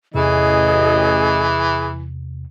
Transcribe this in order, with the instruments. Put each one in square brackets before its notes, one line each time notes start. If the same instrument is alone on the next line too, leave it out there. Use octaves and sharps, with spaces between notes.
[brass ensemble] A1 D#5 [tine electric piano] E2 C3 [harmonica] E3 [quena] G#4